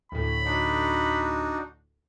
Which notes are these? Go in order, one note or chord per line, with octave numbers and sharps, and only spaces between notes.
D2 A2 B5
D4 D#4 F#4